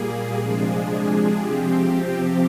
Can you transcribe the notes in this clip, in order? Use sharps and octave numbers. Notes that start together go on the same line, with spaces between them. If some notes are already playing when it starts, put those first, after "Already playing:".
Already playing: A#2 G3 A#3 G#4
C3 F3 G#3 D4 G#4
C3 F3 C4 G4
G4